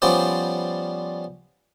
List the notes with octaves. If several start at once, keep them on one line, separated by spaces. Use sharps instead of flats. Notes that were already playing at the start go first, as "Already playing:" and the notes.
F3 G3 B3 C#4 C5 D5